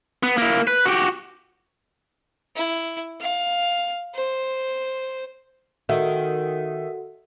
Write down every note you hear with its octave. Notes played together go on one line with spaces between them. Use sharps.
B3
A#3 E4
B4
F#4 G4
E4
F5
C5
D#3 F#4 A4 E5 F#5